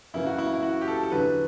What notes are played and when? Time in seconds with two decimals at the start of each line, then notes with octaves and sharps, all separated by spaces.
0.14 F#2 C#3 E3 E4
0.26 F#4
0.38 E4
0.54 E4
0.63 F#4
0.81 G4
0.88 A4
1.03 A4
1.12 E2 D3 F#3 B4